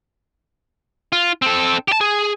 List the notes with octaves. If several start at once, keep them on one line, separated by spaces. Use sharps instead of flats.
F4
C4 A4
G4 A5
G#4